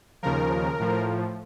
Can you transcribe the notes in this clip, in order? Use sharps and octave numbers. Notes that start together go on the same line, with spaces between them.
D#2 C#3 F3 A#4
A2 F3